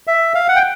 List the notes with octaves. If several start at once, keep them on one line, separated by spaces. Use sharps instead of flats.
E5
F5
F#5
G5